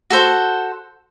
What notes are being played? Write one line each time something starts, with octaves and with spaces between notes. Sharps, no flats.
F#4 A4 C5 F#5